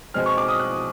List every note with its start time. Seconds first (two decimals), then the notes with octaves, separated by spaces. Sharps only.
0.14 B2 G#3 C4 F6
0.26 C#6
0.37 D6
0.48 D#6
0.60 F#6